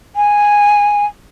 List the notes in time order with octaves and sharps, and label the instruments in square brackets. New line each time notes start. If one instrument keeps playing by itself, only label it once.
[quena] G#5